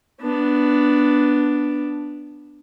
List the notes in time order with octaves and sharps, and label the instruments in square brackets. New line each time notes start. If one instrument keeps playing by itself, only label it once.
[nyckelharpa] B3 D4